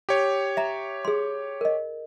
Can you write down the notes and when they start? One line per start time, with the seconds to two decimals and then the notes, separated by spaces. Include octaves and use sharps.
0.09 G4 C#5
0.57 E5 A#5
1.05 G#4 C6
1.61 A#4 D#5